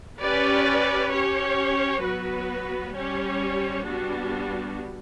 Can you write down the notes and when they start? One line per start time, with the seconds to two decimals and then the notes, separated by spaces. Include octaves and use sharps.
0.20 C#4 G4 B4 D5
1.11 C#4 G4 C#5
2.02 F#3 B3 F#4 B4
2.94 G3 C#4 G4 C#5
3.86 G3 B3 D4 F#4